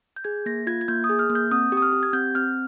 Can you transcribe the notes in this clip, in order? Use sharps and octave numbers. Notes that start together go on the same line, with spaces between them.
G6
G#4 G#6
A#3 A#6
F4 G#6
G#6
A#3 G6
D#6
G#4
F6
A#3
G6
C4 D#6
G4
D#6
F6
G4
G#6
C4 G6
C4 F6